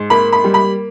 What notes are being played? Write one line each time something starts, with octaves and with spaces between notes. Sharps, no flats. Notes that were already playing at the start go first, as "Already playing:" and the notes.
Already playing: G#2
A#3 B5
B5
G3
B5